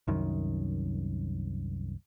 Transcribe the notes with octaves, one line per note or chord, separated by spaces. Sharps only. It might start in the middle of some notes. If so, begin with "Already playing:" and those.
C2 F#2 D#3